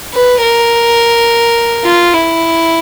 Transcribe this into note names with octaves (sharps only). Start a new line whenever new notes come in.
B4
A#4
F4
E4